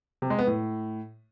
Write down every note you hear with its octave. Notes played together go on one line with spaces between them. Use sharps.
C3
G#3
B3
A2